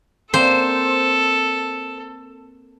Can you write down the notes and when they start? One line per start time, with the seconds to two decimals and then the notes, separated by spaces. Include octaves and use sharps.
0.34 A#3 C4 D4 A4 C5